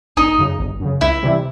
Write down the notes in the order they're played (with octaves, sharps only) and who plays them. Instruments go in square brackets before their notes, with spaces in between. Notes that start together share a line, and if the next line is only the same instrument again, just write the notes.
[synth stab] G1 [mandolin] D#4
[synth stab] F#2 C#3
G1
F#2 C#3
[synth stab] C#2 [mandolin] E4
[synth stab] C3 E3 G3 C4